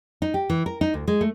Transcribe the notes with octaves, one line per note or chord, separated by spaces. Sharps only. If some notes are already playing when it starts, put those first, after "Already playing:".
D#4
G4
E3
A#4
D#4
D2
G#3
A3